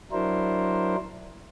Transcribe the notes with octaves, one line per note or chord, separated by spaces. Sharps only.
F#3 D4 E4 A#4 C5